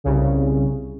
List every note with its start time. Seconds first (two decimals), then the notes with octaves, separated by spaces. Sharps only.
0.04 C2 C#3